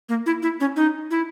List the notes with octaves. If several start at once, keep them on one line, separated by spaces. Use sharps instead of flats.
A#3
E4
E4
C#4
D#4
E4